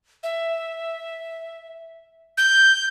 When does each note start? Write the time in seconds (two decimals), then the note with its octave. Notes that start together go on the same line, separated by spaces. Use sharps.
0.23 E5
2.38 G6